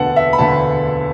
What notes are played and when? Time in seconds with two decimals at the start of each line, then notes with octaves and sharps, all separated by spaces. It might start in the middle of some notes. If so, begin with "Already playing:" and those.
Already playing: E1 D2 D3 B3 F#5 A5
0.16 E5
0.33 B5
0.38 E1 D2 D3 B3 A5